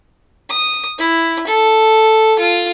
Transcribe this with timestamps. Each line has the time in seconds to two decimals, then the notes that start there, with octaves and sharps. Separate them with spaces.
0.49 D#6
0.98 E4
1.47 A4
2.39 F4